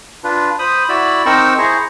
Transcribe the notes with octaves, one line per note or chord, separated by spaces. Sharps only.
D4 F4 B4
C5 B5 D#6
E4 F#4 D5 B5 E6
C4 D#4 A#4 C5 C#6 E6
E4 G#4 C5 A#5 C#6